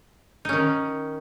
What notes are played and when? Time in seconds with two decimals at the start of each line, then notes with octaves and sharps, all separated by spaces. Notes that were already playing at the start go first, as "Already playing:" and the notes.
0.45 D#4
0.49 C#4
0.53 D#3